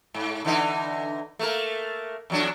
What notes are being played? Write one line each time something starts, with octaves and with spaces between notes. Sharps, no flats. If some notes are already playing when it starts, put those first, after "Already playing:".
G#2
D3 E3 D#4
A3 A#3 A#4
E2 F#3 D4